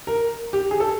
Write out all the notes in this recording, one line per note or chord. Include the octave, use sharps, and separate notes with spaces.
A#4
G4
G#4
A4